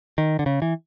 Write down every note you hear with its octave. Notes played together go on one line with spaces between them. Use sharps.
D#3
D3
C#3
E3